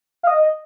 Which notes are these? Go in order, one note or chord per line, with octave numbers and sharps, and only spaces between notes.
F5
D#5